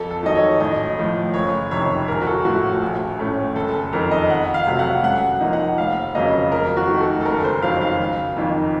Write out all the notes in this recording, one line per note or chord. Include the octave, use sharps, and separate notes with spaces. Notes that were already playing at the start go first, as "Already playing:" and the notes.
Already playing: F2 A4
A4
D#3 F#3 D#5
C#5
A1 D#5
A2 F3 A3
F#1 C#5
F2 C3 D#3 C#5
A#1 A#4
F#4
A4
A2 F3 F#4
A#1
A2 A3 C#4
F#1 A4
A4
F2 D#3 A#4
D#5
F2 F#5
F5
C3 F#3 A3
F#5
F#2 F#5
F3 A#3 D#4
F#5
F1 F5
F2 C#3 F#3 A#3 D#5
F2 A#4
F#4
D#3 A3
A4
A4
F#1 A#4
C5
F2 D#3 F#3 F5
F5
F#1
F2 D#3 A#3 D#4